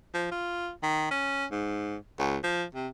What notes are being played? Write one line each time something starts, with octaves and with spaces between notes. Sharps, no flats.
F3
F4
D#3
C#4
G#2
C#2
F3
C3